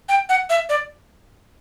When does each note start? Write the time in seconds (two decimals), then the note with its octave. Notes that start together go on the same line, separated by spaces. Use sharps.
0.09 G5
0.29 F#5
0.50 E5
0.69 D5